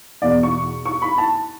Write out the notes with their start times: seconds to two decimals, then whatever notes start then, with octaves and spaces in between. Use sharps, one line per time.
0.22 E2 B2 D5
0.43 C#6
0.86 C#6
1.02 B5
1.18 A5